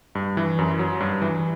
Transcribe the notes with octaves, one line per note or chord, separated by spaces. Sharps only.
G2
E3
F#2
F#3
G2
E3